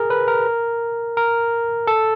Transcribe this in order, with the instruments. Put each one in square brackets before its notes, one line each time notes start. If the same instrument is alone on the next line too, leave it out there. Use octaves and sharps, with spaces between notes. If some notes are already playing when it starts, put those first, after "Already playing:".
Already playing: [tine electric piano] G#4 A#4
B4
A#4
A#4
A4